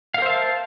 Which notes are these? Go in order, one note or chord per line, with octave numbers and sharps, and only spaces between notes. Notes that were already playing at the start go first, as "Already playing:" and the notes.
A#4 C5 E5 F5 A5